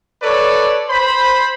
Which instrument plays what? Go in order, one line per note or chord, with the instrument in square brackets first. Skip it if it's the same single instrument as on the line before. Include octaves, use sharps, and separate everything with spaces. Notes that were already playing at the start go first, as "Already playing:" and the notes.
[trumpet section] A4 B4 C#5 D5
C5 B5